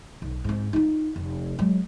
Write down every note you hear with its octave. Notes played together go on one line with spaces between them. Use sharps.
B1
G#2 C4
D#4 F4
F1
F#3 G#3